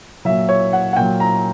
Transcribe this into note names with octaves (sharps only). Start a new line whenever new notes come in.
A#2 F#3 E5
C#5
F#5
F#5
A#2 F#3 G5
A#5